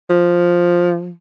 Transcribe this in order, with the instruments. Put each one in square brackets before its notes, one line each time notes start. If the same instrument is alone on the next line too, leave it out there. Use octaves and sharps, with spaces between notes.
[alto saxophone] F3